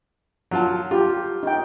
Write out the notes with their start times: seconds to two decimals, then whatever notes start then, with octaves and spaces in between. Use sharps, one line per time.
0.51 F#3 F4 A5
0.91 F4 G4
1.43 D#4 G5